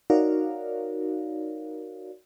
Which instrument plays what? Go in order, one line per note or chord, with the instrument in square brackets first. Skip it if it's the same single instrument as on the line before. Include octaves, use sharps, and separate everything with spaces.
[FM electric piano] D#4 F#4 A#4 C#5 D5 F5